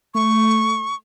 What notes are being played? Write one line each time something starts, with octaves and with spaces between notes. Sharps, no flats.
A3 C#6